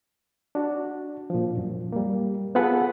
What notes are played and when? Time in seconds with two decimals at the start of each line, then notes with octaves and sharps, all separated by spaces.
0.55 D4 F#4
1.30 A#2 F3
1.57 F#2
1.92 G3 A#3
2.55 B3 F4 G#4 A4 B4 F#5